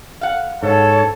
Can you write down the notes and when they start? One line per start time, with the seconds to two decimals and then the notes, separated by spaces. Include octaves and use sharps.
0.21 F5 F#5
0.63 G#2 A4 C#5